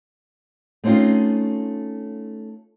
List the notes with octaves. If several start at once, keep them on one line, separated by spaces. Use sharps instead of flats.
A3 C4 C#4 D#4 F4